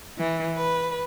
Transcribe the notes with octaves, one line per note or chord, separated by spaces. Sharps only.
E3
B4